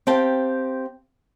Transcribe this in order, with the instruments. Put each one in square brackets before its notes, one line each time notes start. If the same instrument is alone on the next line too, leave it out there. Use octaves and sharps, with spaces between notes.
[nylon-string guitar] C4 G4 F5 G5 A5